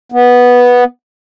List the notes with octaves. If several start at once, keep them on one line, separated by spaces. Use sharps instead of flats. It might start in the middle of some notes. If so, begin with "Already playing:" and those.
B3